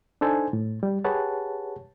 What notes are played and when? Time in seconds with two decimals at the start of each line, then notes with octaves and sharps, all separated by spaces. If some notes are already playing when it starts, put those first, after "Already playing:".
0.21 D4 D#4 A4 C5 G#5
0.53 A2
0.83 G3
1.04 G4 G#4 B4 C#5 F#5 A5